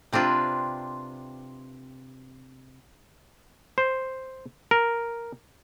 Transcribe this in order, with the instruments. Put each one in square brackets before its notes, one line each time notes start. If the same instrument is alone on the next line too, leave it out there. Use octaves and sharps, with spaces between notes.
[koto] C3 C4 D4 F4 B4
[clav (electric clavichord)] C5
A#4